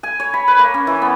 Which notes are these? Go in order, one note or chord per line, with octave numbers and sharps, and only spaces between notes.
G#5
C#5
B5
B4
A#3
C#4
E3
B3